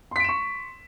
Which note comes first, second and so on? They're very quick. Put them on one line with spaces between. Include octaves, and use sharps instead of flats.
C6 B6 D7 E7 C#6